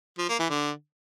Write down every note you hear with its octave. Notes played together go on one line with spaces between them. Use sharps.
F3
A#3
E3
D3